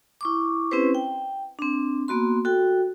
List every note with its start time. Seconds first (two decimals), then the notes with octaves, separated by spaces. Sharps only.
0.21 E4 C#6 D6
0.71 C4 C#4 E4 G4 B4 C5
0.95 G5
1.59 C4 D4
2.08 A#3 B3 F#4 C6
2.45 F#4 A4 G5